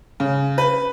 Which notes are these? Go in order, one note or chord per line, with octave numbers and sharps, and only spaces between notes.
C#3
B4